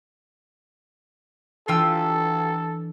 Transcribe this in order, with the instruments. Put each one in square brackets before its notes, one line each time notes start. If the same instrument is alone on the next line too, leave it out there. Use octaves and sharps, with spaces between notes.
[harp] E3 D4 [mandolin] F4 G4 E6 [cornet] A4